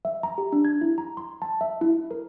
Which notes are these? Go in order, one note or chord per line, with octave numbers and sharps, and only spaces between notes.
E5
A#5
G4
D4
G#6
E4
A#5
C6
A5
E5
E4
A#4